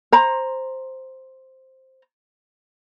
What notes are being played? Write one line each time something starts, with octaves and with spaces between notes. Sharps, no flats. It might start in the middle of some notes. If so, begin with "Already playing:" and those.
C5 A#5